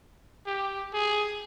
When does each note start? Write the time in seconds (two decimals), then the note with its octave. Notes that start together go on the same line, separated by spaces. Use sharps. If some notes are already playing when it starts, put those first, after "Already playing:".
0.47 G4
0.93 G#4